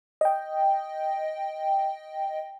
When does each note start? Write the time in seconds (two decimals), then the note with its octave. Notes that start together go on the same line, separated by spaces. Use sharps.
0.21 D#5 G5